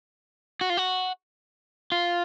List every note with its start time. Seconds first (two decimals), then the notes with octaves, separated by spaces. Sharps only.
0.61 F#4
0.70 F4
0.77 F#4
1.92 F4